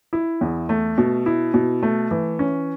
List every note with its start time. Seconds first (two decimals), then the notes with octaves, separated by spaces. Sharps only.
0.13 E4
0.41 E2
0.69 A3
0.98 B2
1.26 E4
1.54 B2
1.83 A3
2.11 E3
2.39 C#4